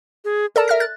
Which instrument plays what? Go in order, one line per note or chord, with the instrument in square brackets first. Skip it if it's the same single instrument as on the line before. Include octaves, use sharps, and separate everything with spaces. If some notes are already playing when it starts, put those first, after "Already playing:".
[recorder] G#4
[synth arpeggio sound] A4 D5 A5 [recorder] A#4
[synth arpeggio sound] E5 F6 A#6
F#6 A6